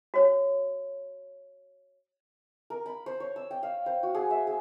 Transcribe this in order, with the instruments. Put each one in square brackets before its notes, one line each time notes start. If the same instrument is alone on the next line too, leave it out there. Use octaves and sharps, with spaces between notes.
[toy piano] F#4 C#5
[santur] A#4
B5
C5
C#5
E6
G5
F5
C5
F#4
G#4
E5
G#4